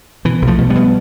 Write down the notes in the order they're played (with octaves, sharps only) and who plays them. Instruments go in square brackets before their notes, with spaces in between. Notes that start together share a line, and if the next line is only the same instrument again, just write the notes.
[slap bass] B2 E3
B1
F3 A3
B2
G3 B3
B2